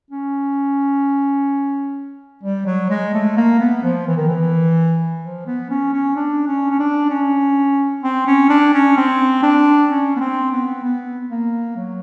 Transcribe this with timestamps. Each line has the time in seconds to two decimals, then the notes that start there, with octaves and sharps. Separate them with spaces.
0.11 C#4
2.43 G3
2.66 F#3
2.90 G#3
3.14 A3
3.37 A#3
3.60 B3
3.84 F3
4.07 E3
4.17 D#3
4.28 E3
5.23 F3
5.47 B3
5.70 C#4
5.93 C#4
6.16 D4
6.47 C#4
6.71 C#4
6.79 D4
7.10 C#4
8.03 C4
8.27 C#4
8.50 D4
8.73 C#4
8.97 C4
9.43 D4
9.90 C#4
10.16 B3
10.20 C4
10.52 B3
10.84 B3
11.30 A#3
11.77 F#3